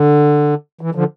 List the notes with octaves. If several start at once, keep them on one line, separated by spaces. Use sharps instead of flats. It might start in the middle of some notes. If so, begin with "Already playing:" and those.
Already playing: D3
E3
D3 F3